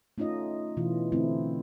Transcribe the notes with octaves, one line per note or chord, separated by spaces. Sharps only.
A3 C#4 D#4 F4 D#5
B2 E3 F4
D3 A3 C4 E4